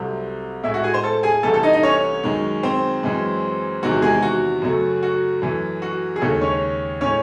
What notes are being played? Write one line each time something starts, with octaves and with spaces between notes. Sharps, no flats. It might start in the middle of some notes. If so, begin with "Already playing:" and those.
Already playing: C2 C3 F#3 A3
A2 G#3 E4 E5
F#4 F#5
G#4 G#5
C5 C6
A4 A5
G#4 G#5
C2 C3 E3 A3 A4 A5
A4 A5
D#4 D#5
D#4 D#5
C#4 C#5
F#2 D#3 G#3
C4 C5
F#2 E3 G#3
E2 C3 D#3 G#3 F#4
G#3 G#4
F#4
F#2 C#3 F#3 A3
F#4
F#2 E3 A3
F#4
G#4
D#2 C#3 G#3 A3 A4
C#4 C#5
A2 G#3 C#4 C#5